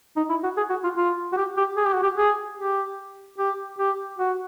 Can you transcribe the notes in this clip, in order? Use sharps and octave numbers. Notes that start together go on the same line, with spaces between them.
D#4
E4
F#4
G#4
F#4
F4
F4
F#4
G4
G4
G#4
G4
F#4
G4
G#4
G4
G4
G4
F#4